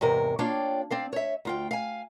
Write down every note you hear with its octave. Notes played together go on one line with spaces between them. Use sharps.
E2 G#2 C3 A#4
A#3 D4 F4 C#5 D5 G5
C4 D5 F5
C#5 E5
D2 F4 G5
F5 G#5